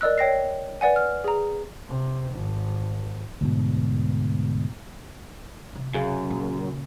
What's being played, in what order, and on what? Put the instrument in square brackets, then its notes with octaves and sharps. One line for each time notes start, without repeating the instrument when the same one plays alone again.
[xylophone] A#4 D5 D#5 E6 F#6
C#5 G5 A#6 C7
B4 D5 F#5 G#5
F6
G#4 A#5
[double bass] C3
G#1
[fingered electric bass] D2 G#2 B2
[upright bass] C3
[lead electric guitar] F#2 [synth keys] C#3
[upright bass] A#2